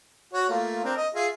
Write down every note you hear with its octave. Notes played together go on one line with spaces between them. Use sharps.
F#4 C#5
A3 A#3 F4
C4 D4 A#4
D#5
F4 G#4 E5